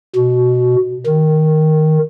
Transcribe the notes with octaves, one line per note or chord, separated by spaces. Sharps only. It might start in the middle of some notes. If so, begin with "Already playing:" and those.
B2
D#3